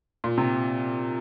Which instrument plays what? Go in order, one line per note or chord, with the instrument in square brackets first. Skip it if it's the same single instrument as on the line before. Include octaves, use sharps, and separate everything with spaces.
[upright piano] A#2
C3